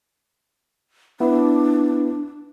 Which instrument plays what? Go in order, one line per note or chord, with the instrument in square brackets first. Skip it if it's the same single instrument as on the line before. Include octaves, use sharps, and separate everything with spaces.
[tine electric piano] B3 E4 [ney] D4